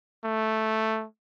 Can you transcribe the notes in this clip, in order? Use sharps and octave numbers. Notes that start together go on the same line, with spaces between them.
A3